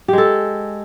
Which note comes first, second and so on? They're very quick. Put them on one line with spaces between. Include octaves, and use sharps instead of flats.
G4 G#3 A4